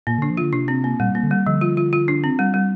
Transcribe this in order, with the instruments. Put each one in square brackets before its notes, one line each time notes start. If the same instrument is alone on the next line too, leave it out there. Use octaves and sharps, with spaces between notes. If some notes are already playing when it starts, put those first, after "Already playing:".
[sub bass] A#2 [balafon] A#3
[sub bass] D3 [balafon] D4
[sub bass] F3
[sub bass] D3 [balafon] F4
[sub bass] C3 [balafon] D4
[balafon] C4
A#3
[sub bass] A#2 [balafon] G3
[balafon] A#3
[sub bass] D3
[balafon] G3
[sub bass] D3 [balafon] F3
[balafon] F4
F4
F4
D4
C4
G3
G3